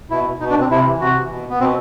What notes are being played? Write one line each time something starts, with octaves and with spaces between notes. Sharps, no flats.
B2 E4
B2 D#4
D4
C4
C3 E4
E3
C3 F#4
E3
B2
B3
B2 C4